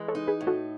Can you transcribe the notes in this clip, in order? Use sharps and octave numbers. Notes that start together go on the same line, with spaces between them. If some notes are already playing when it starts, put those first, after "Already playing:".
Already playing: E3 G#3
A4 C#5
D#4
G#4 B4
A2
F#4 A4